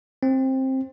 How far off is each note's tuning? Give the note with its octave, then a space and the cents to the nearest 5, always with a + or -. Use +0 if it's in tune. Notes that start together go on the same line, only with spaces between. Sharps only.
C4 +15